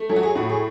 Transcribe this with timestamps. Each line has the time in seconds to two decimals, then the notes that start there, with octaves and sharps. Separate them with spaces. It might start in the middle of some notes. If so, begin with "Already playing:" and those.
Already playing: A3
0.09 F#3 A4
0.16 F#4
0.23 G#4
0.35 A2 F#4
0.50 G#4